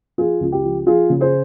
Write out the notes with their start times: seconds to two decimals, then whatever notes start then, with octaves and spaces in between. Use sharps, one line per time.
0.18 F3 F4 G#4
0.41 C#2
0.52 G4
0.64 F3
0.86 F3 F4 G#4
1.10 C#3
1.21 G#4 C5